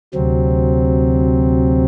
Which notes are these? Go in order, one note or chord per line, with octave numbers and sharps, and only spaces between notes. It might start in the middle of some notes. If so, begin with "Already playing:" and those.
D2 C3 F#3 C4